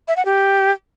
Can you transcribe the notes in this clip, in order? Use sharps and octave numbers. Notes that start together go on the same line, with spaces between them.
E5
F#5
G4